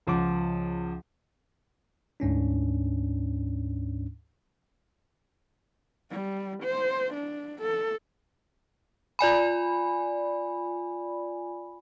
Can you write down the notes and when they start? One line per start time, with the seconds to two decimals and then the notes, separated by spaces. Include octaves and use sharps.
0.07 C#2 F3 F#5 D6
2.20 D2 G#2 C#4 D4
6.11 G3
6.63 C5
7.14 D4
7.62 A4
9.19 F4 D5 G#5 B5